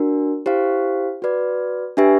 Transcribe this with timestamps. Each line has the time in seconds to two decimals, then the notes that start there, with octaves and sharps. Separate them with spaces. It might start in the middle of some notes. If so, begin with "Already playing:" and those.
Already playing: D4 F#4 A#4
0.46 E4 G4 C5 F5
1.22 F#4 B4 D5
1.97 D4 G4 B4 E5 G#5